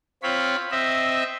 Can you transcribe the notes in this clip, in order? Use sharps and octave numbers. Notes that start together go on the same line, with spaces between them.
C4 F4 C#5 B5
C4 D#5 E5